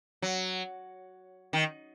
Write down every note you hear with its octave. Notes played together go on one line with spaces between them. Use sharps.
F#3
D#3